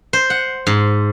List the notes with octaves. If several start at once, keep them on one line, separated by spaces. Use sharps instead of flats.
C5
F#5
G#2